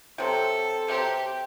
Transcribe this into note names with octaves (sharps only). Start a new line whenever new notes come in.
C3 F#3 C4 A4
C3 F#3 C4 G4